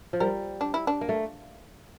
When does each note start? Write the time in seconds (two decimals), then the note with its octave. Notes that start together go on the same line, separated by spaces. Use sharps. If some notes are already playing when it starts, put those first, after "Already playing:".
0.13 F3
0.20 G3 A#4
0.61 D4
0.74 E4
0.87 D4
1.01 A#3
1.09 A3